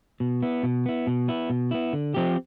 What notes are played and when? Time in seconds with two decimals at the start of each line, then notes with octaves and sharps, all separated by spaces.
0.20 B2
0.43 B3 E4
0.63 B2
0.86 B3 E4
1.07 B2
1.28 B3 E4
1.50 B2
1.71 B3 E4
1.93 D3
2.14 F3 C4 G4